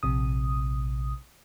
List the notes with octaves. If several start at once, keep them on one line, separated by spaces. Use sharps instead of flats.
A#1 C3 D#6